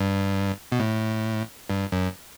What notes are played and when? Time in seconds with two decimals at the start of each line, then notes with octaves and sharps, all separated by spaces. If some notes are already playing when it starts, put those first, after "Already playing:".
Already playing: G2
0.72 B2
0.79 A2
1.70 G2
1.92 F#2